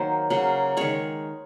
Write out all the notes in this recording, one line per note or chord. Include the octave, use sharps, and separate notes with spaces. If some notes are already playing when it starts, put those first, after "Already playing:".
Already playing: D#3 F#3 A#3 C5
C#3 F#3 A#3
D#3 G#3 C#5